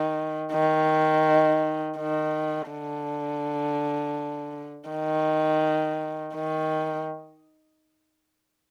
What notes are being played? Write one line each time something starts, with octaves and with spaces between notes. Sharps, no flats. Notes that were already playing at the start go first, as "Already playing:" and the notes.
Already playing: D#3
D#3
D#3
D3
D#3
D#3